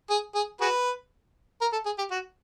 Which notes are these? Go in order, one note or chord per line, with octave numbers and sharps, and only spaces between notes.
G#4
G#4
F#4 G#4 B4
A#4
A4
G#4
G4
F#4